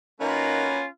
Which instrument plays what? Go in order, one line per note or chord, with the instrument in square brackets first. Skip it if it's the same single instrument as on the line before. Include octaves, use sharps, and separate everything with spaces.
[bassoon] D#3 [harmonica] A#3 F#4 B4 [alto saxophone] C#4 [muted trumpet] F4